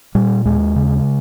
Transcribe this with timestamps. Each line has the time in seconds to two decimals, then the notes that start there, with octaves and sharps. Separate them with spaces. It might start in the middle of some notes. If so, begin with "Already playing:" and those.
0.15 A#2 G3
0.45 D#2 G#3
0.76 C#3